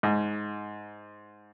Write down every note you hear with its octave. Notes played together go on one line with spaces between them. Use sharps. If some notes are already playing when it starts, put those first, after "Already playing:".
G#2